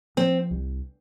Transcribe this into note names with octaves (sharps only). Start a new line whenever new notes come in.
F3 C4
C2